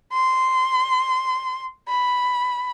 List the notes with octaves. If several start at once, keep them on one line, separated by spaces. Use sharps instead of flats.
C6
B5